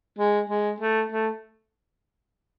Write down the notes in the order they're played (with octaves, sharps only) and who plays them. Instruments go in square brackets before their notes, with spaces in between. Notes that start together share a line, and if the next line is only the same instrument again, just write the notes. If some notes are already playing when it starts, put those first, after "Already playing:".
[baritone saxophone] G#3
G#3
A3
A3